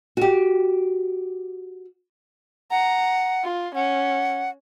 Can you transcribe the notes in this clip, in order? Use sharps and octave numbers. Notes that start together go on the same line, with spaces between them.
F#4 G4
F#5 A#5
F4
C#4 F#5